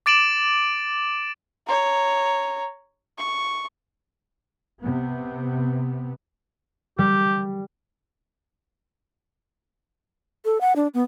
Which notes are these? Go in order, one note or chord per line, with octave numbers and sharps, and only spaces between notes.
D6 A6 D7 E7 F#7
C#5 A#5
C#6
C3 B3
G3 G4
A4
F#5
D4
B3